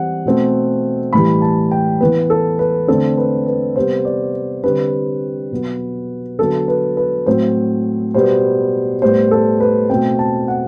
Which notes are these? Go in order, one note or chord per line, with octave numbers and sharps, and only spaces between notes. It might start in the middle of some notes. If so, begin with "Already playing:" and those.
Already playing: E3 G3 C4 F#5
B2 A3 C4
A2 E3 G3 B5
A5
G5
E3 B3 B4
A4
B4
D3 A3 C4 A4
B4
B4
C3 G3 B3 C5
D5
D3 G3 C4 B4
B2 F#3 B3
D3 F#3 B3 A4
B4
B4
A2 F#3 C4 C5
B2 G3 B3 C5
A2 G3 B3 C5
A4
B4
B2 A3 C4 G5
A5
F#5